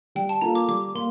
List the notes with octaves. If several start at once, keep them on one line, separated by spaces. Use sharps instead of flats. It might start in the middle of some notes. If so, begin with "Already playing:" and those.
G3 G5
A5
A#3 F4 A4 A#5
D6
G3 D6
A#3 C6